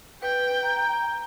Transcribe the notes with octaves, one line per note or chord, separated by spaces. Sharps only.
B4 G5
A#5